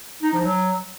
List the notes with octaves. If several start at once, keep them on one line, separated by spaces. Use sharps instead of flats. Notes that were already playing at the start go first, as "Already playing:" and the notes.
D#4
F3
F#3